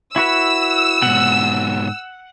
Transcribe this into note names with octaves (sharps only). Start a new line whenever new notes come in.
E4 F#4 B4 E6
G#2 B2 F#5